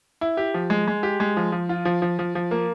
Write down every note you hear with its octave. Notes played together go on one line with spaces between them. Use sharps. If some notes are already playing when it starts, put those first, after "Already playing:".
E4
G4
F3
G#3
G#3
G4
G#3
F3
F3
F4
F3
F3
F3
F3
A#3